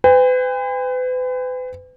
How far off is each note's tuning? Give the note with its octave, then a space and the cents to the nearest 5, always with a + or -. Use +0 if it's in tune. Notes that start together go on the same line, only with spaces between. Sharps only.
B4 +40 G5 +45